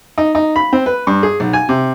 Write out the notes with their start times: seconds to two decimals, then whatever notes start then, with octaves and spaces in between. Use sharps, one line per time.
0.18 D#4
0.35 D#4
0.56 B5
0.73 C4
0.86 B4
1.07 G2
1.23 G#4
1.40 B1
1.53 G#5
1.69 C3